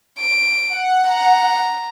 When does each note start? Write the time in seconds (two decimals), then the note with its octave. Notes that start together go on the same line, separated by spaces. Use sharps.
0.20 D7
0.74 F#5
1.09 A#5